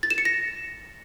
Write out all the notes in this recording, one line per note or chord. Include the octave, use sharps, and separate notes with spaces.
A6
E7
C#7
A#6